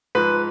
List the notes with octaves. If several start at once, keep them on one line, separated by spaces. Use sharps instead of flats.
G#2 F3 B4